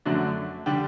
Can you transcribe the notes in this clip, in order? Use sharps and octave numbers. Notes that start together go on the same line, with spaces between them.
F#2 D3 A3 D4 F#4
D3 G3 D4 G4